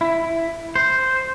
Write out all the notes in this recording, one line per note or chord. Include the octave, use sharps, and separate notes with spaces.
E4
C5